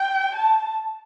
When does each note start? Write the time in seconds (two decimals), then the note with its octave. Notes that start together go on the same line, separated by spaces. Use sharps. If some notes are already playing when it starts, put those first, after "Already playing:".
Already playing: G5
0.35 A5